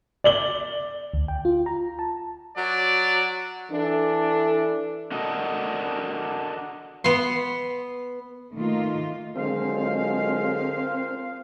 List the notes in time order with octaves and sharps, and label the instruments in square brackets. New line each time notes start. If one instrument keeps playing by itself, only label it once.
[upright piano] D5 F#7 G7
[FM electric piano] D2
G5
F4
A#5
A5
[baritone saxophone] F#3 [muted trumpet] D5
[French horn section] E3 D4 A4
[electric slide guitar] D4 F#4 A4 A#4 D#5
[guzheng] B3 C6
[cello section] D#3 A3 A#3 D#4 F4
[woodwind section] A#2 F3 F5 [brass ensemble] D3 F#3 G#3 [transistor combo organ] C4